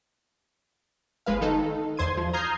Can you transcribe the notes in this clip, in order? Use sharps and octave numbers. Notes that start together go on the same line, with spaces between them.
G1 G#3 B4 F5
D#3 D#4 A4
E2 C5 C6 G#6 D#7
F3
A#5 D#6 F6 G6 G#6 C7